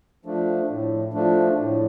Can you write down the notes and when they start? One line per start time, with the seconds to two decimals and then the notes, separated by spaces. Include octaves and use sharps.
0.25 F3 A3 D4
0.69 A2
1.13 F3 A3 D4
1.58 A2